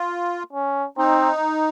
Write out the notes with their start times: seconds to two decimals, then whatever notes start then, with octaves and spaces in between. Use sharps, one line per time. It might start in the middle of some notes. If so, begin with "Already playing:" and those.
Already playing: F4
0.53 C#4
0.98 C4 D#4